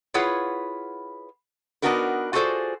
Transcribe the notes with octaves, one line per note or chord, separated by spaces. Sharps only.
E4 F4 G#4 B4 C#5 F#5
B3 D4 D#4 F#4 A#4 B4
F4 F#4 G#4 A4 C5 D5